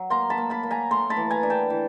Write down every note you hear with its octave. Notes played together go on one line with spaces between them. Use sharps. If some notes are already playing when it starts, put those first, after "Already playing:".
Already playing: F#3
A#3 A#5 C6
A5 B5
A#3
A5 B5
A#3
G#5 A#5
A3 A#5 C6
A5 B5
E3
G#5 A#5
D4
G5 A5
E3